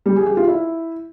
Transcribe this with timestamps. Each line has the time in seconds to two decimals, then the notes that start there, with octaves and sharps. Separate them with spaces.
0.06 G3
0.16 G#4
0.27 G4
0.37 F4
0.48 E4